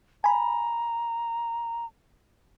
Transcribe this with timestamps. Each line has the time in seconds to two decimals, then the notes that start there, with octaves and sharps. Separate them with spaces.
0.24 G#5 A#5 B5